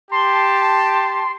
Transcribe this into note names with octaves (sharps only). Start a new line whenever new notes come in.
G4 A5 C6